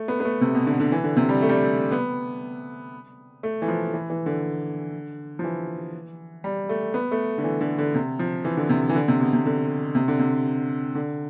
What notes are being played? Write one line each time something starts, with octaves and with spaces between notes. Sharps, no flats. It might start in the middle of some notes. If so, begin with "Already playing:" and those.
Already playing: A3
B3
B3
A3
C3
B2
D3
D3
E3
D3
C3
G3
A3
G3
A3
B3
A3
E3
F3
E3
E3
D3
F3
E3
G3
A3
B3
A3
D3
E3
D3
D3
C3
F3
E3
D3
C3
E3
D3
C3
B2
C3
D3
C3
D3
C3
D3